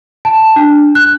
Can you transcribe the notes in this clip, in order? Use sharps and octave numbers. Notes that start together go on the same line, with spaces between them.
A5
D4
F#6